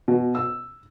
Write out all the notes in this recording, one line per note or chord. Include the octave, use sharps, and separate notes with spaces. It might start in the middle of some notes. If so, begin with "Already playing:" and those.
B2
E6